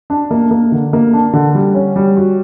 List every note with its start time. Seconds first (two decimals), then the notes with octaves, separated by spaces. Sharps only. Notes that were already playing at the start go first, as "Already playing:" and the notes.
0.10 D4
0.31 A#3
0.51 A#3
0.72 D3
0.93 A#3
1.13 D4
1.33 D3
1.55 G3
1.75 C#4
1.96 G3
2.17 F#4